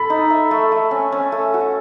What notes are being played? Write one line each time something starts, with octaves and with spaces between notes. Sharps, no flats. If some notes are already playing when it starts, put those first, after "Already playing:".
Already playing: A4 B5
D#4
E5
A3
A3
C#4
C#4
A3
F#4